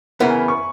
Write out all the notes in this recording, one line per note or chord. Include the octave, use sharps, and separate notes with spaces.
C#3 E3 B3 E4 A#4 E5
G#5
B5
C#6